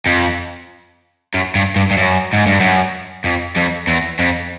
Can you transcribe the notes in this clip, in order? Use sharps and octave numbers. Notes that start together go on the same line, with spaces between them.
F2
F#2
G2
G2
G2
F#2
G#2
G2
F#2
F2
F2
E2
F2